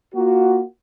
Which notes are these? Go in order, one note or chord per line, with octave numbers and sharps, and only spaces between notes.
A#3 F4 F#4